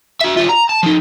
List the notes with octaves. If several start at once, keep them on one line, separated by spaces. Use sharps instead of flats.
F#4 E5
G3 F4
A#5
A5
F3 D#4